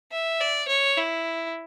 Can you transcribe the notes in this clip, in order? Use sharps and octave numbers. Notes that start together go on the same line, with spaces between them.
E5
D5
C#5
E4